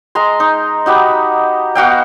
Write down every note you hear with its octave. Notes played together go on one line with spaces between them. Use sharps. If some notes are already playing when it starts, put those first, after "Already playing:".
G#3 A#5 C6
D#4
D#4 F#4 G4 B5
B3 F#4 F5 G5